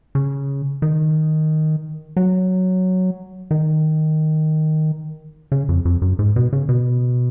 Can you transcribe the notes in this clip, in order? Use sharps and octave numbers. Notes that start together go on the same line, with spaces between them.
C#3
D#3
F#3
D#3
C#3
F2
F2
F#2
G#2
B2
C#3
B2